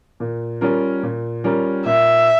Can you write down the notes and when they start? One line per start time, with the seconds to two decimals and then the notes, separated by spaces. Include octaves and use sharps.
0.20 A#2
0.61 G3 C#4 F4 A#4
1.03 A#2
1.44 G3 C#4 F4 A#4
1.86 A#2 E5